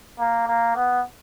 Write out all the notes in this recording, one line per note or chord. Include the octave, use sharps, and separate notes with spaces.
A#3
A#3
B3